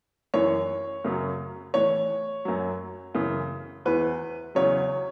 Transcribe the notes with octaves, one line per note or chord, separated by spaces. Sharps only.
F#2 E3 C#5
F#2 C#3 F#3
A2 E3 C#5
F#2 F#3
F#2 C#3 E3
E2 E3 B4
E2 C#3 F#3 C#5